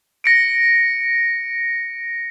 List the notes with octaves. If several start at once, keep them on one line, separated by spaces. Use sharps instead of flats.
A#6 C#7 D7